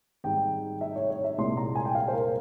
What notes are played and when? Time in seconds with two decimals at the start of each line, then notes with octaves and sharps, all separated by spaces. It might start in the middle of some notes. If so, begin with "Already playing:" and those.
0.24 G#1 G#2 G3 G5
0.81 E5
0.96 C#5
1.10 C#5
1.24 E5
1.38 C2 A#2 G#3 C6
1.57 A#5
1.75 G#5
1.85 G5
1.95 F5
2.08 C5
2.13 A#4